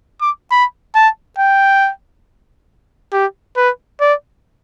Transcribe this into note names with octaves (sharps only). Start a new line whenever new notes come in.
D6
B5
A5
G5
G4
B4
D5